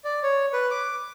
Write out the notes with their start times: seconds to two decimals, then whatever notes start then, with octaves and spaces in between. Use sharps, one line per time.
0.04 D5
0.23 C#5
0.53 B4
0.71 D6